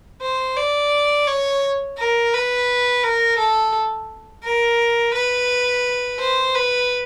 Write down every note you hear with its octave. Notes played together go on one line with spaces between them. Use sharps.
C5
D5
C#5
A#4
B4
A#4
A4
A#4
B4
C5
B4